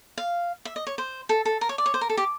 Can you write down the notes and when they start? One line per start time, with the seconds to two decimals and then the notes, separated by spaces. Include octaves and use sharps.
0.18 F5
0.65 E5
0.76 D#5
0.87 C#5
0.98 C5
1.29 A4
1.45 A4
1.61 A#4
1.69 C#5
1.78 D5
1.86 C#5
1.94 C5
2.01 A#4
2.09 A4
2.17 G4